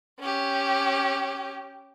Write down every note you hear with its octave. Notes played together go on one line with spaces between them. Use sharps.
C#4 G4